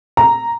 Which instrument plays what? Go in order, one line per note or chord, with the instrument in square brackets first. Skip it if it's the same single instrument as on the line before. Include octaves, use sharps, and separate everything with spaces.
[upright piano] A#5